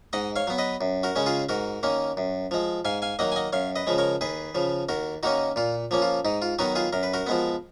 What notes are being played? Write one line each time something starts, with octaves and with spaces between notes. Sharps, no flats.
G#2 D#5 F#5
C#5 F5
F#3 B3
B4 D#5
F#2
F#4 A#4
C#3 G#3 C#4
F4 G#4
G#2 F#4 A#4
D#3 A#3 C#4
F#2
F3 G#3
G#2 F5 G#5
F5 G#5
D#3 F#3 A#3 D#5 F#5
G#5
D#5 F#5
F#2 C#5 F5
B4 D#5
C#3 F3 G#3
A#4 C#5
D#2 G#4 B4
C#3 F3
D#2 F#4 A#4
D#3 A#3 C#4 D#4 F#4
A#2 F4
F3 A#3 C#4
F4
G#2 D#4
F4
D#3 F#3 B3 D#4 F#4
F4 G#4
F#2 A#4
B4
F#4 A#4
F3 G#3 B3